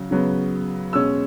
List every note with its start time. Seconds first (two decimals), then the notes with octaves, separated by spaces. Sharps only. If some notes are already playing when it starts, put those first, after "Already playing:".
Already playing: C#3 F#3
0.11 C#3 F#3 B3
0.93 B2 G#3 C#4 E6